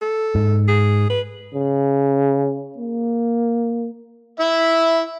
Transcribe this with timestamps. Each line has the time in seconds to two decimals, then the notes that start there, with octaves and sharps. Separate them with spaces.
0.02 A4
0.35 G#2
0.68 G#4
1.10 B4
1.54 C#3
2.78 A#3
4.40 E4 E5